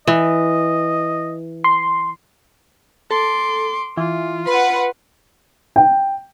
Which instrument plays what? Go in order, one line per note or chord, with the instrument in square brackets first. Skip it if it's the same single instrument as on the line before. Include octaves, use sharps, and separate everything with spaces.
[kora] E3 [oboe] D#5
[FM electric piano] C6
[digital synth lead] A4 [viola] C6 D6
[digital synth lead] E3 [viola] F4
[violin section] B4 F#5 [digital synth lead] C6
[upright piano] G5